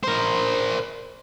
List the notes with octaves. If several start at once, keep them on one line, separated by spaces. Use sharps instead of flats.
A#4 C5